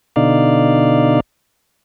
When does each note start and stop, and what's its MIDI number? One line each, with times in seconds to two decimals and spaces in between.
0.16 1.20 47
0.16 1.20 50
0.16 1.20 63
0.16 1.20 74
0.16 1.20 77